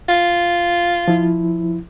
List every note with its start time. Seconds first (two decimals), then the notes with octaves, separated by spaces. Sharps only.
0.09 F4
1.08 F3 E4